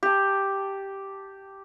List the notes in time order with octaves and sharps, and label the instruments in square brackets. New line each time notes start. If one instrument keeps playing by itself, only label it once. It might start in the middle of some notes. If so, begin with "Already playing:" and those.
[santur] G4 A5